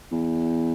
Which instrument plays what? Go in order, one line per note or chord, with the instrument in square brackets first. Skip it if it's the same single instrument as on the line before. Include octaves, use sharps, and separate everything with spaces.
[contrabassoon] E2